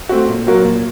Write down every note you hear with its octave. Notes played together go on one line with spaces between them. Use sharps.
A3 C4 F#4
A#2
F#3 A#3 F#4 A#4
A#2